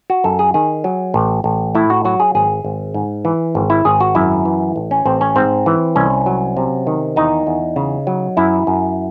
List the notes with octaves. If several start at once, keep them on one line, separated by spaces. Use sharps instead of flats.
F#4
F#2 A4
G#4
D#3 G#4
F#3
A1
A1
A2 E4
F#4
F#3 F#4
G#4
G#1 G#4
G#1
G#2
E3
G#1
E4
G#1 G#4
F#4
F#2 E4
E3
A1
C#4
A1 C4
C#4
G#2 C4
E3
C2 C#4
F#3
C3
D#3
E2 D#4
E2
C#3
F#3
F#2 E4
F#2